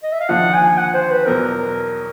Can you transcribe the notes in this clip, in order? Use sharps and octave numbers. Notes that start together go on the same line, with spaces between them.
D#5
E5
F5
D#2 D3 F3 F#5
G#5
F#5
C5
B4
E2 B2 F#3 A#4